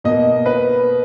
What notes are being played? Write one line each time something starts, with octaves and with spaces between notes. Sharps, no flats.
B2 A#3 D#5
B4